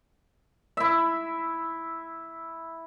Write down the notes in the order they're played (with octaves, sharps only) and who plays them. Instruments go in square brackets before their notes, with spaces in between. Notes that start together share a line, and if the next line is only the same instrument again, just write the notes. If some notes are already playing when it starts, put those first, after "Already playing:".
[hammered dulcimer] E4 E5